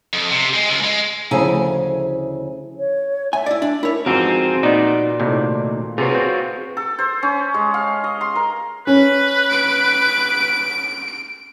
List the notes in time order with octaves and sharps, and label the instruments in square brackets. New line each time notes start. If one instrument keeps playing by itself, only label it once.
[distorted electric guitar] F2
C3
G#3
C#2
G#3
[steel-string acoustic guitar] D2 C#3 F3 E4 G#5 A#5
[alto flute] C#5
[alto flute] E5 [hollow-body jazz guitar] G#5
[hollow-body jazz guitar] E4 D5
D4
[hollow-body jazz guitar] E4 C#5 [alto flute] A#4
[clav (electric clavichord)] F2 G#2 E3 [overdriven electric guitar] C4 [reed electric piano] F#4 [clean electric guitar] G#4 A#4
[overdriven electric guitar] A#2 [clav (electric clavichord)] B3 D#4 [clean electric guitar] D5
[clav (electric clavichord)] D#2 A2 C3
[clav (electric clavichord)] C3 [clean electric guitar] F4 F#4 C#5 [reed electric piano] G#4 B4
[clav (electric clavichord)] C4
[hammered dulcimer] A4
C5
C#4
G#3
F5
D#5
C6
A#4
[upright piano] C#4 [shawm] B4
[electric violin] D7